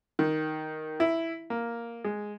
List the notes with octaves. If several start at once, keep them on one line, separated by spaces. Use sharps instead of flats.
D#3
E4
A#3
G#3